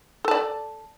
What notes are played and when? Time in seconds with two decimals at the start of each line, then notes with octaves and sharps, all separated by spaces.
0.25 A4
0.28 A5
0.31 D5